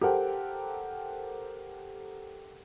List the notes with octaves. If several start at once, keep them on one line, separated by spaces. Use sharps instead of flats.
G4 A4 A#4 C5 F#5 G5